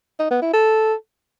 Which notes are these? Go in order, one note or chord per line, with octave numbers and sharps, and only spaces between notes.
D#4
B3
E4
A4